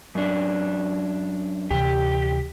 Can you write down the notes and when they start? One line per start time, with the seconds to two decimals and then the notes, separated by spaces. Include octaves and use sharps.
0.15 F#2 D4
1.71 D2 C3 E3 G4